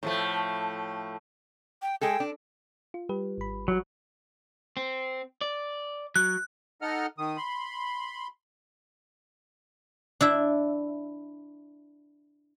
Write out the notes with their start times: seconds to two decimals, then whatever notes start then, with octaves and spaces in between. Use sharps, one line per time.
0.03 A2 F3 A3
1.82 G5
2.01 G#3 G#4 A4 G5
2.20 D4
2.94 F4
3.09 G3 G4 B4
3.38 G#1 B5
3.68 F#3
4.77 C4
5.41 D5
6.16 F#3 F#6
6.82 D#4 A4 D#5 F#5 F6
7.18 D#3 D#6
7.37 B5 C6
10.21 D4 E4 E5